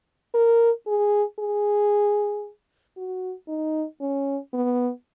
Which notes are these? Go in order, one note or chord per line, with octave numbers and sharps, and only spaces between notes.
A#4
G#4
G#4
F#4
D#4
C#4
B3